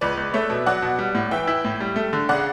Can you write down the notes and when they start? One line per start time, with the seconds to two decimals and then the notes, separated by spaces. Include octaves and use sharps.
0.01 C#2 B4 D5
0.17 C#2
0.34 A3 C#5 E5
0.50 B2
0.66 F#3 D5 F#5
0.82 B2
0.98 G3
1.15 A2
1.31 E3 E5 G5
1.48 E4
1.64 A2
1.80 G3
1.96 A3
2.13 D3
2.29 C#3 D5 F#5